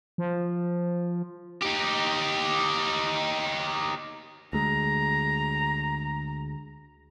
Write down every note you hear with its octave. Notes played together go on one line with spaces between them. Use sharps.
F3
D#4 G4
D2 G#3 A#5